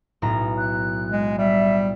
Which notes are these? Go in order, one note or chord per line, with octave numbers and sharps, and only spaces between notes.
B1 A2 A#5
F#6
G#3
G3 E5